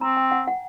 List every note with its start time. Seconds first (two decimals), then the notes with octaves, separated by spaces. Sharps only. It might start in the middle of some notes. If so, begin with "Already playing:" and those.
0.01 C4 A#5
0.17 G5
0.32 F#5
0.47 F#5